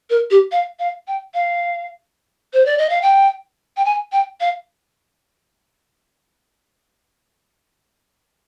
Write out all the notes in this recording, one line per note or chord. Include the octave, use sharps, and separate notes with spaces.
A#4
G4
F5
F5
G5
F5
C5
D5
D#5
F5
G5
G5
G#5
G5
F5